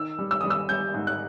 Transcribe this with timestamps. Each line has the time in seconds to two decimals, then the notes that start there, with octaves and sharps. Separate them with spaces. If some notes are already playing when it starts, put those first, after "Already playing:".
Already playing: D#3 E6
0.18 G3
0.31 E6
0.41 G3 D#6
0.50 E6
0.69 G3 G6
0.94 G#2
1.07 F#6